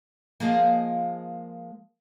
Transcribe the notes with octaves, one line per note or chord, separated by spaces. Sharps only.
F3 G#3 A#3